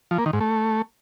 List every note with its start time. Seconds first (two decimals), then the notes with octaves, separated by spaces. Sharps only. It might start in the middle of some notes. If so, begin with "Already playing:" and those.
0.11 F3
0.18 A#3
0.26 D#3
0.33 G#2
0.41 A3